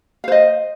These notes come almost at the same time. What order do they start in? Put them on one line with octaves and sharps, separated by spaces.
F5 C5 D#5